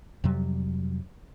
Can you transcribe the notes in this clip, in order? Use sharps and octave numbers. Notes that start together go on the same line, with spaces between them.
F2 C3 F#3 G3